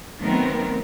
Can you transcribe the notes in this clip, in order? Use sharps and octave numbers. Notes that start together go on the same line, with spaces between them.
D#3 F#3 A3 B3 C4 A#4